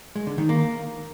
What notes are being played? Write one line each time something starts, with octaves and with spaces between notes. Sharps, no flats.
G#3
D3
D#3
A#3